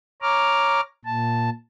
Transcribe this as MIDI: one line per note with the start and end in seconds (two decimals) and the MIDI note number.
0.22 0.81 73
0.22 0.81 82
0.22 0.81 86
0.22 0.81 89
1.05 1.50 46
1.05 1.50 81